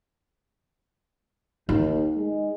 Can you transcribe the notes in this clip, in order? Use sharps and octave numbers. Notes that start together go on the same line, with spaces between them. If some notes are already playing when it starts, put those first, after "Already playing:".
D#2 D#4
G#3